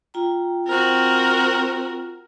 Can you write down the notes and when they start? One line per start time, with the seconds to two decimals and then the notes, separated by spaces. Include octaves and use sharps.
0.14 F4 G5 A#5
0.67 C4 F#4 A#4